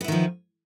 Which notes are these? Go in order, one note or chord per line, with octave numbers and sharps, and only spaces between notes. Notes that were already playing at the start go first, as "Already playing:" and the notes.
D#3 F3 B3 E4